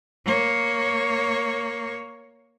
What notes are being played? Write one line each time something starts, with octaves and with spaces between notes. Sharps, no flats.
A#3 C#5